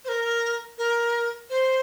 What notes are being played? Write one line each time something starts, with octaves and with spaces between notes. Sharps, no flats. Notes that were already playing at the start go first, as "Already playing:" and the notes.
C5
A#4
A#4
C5